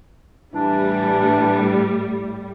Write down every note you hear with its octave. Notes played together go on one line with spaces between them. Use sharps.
A2 E3 G3 D4